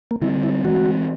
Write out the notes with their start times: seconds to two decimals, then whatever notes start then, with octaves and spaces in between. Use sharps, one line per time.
0.11 A#3
0.21 D3 G3 C4 E4
0.43 E4
0.64 E3 G#3 C4 F#4